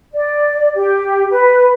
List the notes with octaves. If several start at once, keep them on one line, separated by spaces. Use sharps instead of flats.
D5
G4
B4